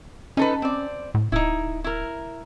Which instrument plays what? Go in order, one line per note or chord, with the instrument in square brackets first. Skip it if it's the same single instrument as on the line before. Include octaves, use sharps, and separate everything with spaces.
[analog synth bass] C#4 [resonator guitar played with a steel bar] D#4 A4 B4
[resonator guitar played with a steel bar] C4 D5
[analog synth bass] A2
[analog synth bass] D1 [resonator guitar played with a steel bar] D#4 E4
[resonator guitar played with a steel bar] E4 A#4